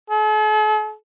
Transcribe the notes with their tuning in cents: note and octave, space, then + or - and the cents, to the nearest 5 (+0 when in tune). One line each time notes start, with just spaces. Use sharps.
A4 -45